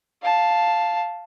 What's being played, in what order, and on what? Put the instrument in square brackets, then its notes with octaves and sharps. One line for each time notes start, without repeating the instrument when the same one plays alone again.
[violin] F5 A5